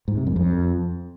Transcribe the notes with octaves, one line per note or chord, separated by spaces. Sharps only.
G#2
C3
F#2
F2